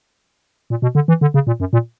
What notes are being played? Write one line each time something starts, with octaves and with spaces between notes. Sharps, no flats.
A#2
B2
D3
E3
D3
C#3
A#2
F#2
A#2